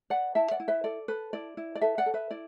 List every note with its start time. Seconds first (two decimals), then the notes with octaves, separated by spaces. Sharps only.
0.10 B4 D5 F#5
0.35 E4 E5 A5
0.51 D5 F#5
0.60 E4
0.68 B4 E5
0.84 A4 D5
1.08 A4 B4
1.33 E4 D5
1.57 E4
1.75 D5
1.81 A4 B4 E5
1.98 D5 F#5
2.06 A4
2.14 B4 E5
2.31 E4 D5